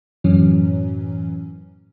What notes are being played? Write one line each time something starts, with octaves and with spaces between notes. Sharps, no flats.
F#2 A2 E3 F#3 C#4